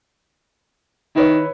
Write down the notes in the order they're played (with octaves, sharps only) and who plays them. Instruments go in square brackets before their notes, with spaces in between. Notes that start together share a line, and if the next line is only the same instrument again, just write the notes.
[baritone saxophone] D#3 [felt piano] E4 B4 C#5